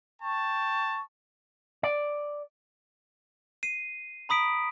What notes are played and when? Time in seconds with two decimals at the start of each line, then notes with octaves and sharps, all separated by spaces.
0.22 G5 A5 C#6
1.83 D5
3.63 C7 D#7
4.29 A#5 B5 D#6 B6 D7